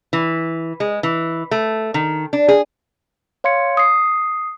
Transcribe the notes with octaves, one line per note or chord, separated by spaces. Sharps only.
E3
G#3
E3
A3
D#3
D4
G#4
C#5 F5 C6 G#6 C#7
D#6 C7